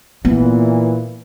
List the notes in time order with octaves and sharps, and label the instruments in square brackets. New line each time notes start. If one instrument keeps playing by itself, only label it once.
[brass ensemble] A#2 E3 [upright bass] B3